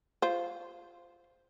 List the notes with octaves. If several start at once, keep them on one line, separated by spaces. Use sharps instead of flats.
F4 C5